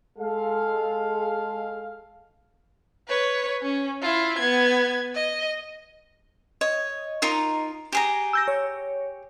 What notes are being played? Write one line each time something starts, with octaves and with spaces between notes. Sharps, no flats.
G#3 A4 F5
B4 C#5
C#4
E4 F4
B3 G#6
D#5
C#5 D#5
D#4 F4 A#4
G4 G#4 A#5
E6 G6 A#6
C#5